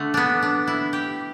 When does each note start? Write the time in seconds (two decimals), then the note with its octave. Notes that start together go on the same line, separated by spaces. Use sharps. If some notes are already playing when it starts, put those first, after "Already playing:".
Already playing: D3 A3
0.14 B3 D4
0.42 D4
0.67 E4
0.93 G4